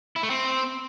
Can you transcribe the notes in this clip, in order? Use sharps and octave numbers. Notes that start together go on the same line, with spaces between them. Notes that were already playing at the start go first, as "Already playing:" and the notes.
E4
A3
C4